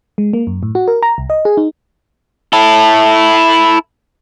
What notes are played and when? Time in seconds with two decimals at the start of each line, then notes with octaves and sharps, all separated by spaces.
0.18 G#3
0.33 A#3
0.47 F#2
0.63 A2
0.75 F#4
0.88 A#4
1.03 A#5
1.18 C2
1.30 D#5
1.45 G#4
1.57 D#4
2.53 E4 A4